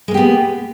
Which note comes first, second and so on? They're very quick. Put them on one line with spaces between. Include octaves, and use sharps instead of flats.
G#3 A#3 G4 B3